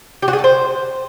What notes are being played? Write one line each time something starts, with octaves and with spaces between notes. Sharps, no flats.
G4
F#4
G#4
A4
C5